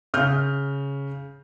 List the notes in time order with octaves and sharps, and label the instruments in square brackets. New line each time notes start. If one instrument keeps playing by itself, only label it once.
[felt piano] C#3 F6 G6